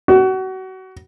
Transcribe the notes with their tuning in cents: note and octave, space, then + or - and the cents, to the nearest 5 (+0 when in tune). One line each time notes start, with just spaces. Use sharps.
F#4 +30